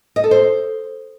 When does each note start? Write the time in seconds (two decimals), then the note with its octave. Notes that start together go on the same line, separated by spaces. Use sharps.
0.16 D#5
0.24 A4
0.31 C5